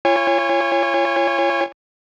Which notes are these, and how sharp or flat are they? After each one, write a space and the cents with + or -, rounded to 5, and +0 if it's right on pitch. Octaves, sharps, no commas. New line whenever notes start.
F4 -40 C#5 -5 G#5 -30